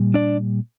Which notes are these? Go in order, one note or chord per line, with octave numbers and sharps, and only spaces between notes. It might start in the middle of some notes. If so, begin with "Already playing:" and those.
Already playing: A#2 G3
D4 D5